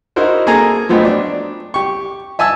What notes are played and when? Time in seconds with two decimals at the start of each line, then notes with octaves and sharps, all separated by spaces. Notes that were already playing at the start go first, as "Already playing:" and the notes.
0.16 D#4 E4 F#4 A#4 C5
0.47 A#3 G#4 A4 G#5 A#5
0.89 F3 F#3 A3 B3 C4 D#4
1.05 D4
1.74 G4 C#6
2.39 E5 G#5 A5 E6